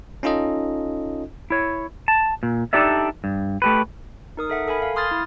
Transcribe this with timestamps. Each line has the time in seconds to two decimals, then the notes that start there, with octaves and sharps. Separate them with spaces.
0.23 C#4 D#4 F4 A4 D#5
1.50 E4 C#5
2.08 A5
2.43 A#2
2.73 D4 D#4 G4 A4 D5 E5
3.24 G2
3.62 A3 G4 B4
4.37 D#4 A#4 D#6
4.50 A4 E5 F#5
4.68 A4 A#4 G#5 B5
4.82 F5
4.96 C6 D#6 F6 G#6 A6
5.11 E4